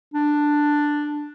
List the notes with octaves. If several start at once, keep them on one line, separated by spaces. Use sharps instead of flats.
D4